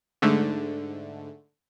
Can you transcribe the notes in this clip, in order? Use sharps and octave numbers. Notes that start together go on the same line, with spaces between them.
G#2 D3 A3